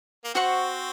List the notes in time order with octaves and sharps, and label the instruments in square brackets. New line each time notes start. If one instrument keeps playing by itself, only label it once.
[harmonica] A#3
[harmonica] C4 [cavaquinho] F#4 C5 F#5 C#6